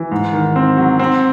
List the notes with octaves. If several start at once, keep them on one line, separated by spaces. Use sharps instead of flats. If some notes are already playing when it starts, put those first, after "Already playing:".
Already playing: E3
G#2
D#3
C4
F#3
C4